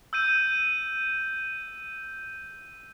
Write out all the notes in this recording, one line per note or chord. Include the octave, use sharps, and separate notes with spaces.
E6 G6 D#7